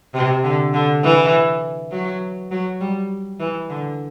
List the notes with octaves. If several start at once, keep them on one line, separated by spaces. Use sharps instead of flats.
C3
D3
D3
E3
F#3
F#3
G3
E3
D3